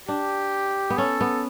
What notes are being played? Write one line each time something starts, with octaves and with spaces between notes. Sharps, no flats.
D4 G4
B3
C#4 A4
B3